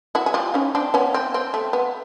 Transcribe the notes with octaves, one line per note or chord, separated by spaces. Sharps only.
E4 F#4
G#4
F4 G4
C#4 D#4
C4 D4
B3 C#4
C4
C4
A3
B3